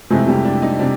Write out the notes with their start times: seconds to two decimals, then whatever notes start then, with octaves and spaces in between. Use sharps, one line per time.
0.10 F2 C3 E3 G#3 A3 G#4
0.28 G3 G4
0.45 D4
0.62 D#4
0.79 C3 D4